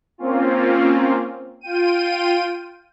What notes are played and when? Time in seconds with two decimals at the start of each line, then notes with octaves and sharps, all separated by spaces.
0.18 A#3 C4 C#4 F4
1.61 F4 G5 D#7